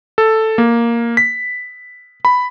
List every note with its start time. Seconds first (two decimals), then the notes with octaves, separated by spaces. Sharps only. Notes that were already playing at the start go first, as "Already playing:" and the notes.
0.18 A4
0.58 A#3
1.17 B6
2.25 B5